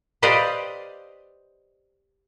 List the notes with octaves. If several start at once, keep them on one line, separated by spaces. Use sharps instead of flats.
G4 B4 C5 D5 D#5 F5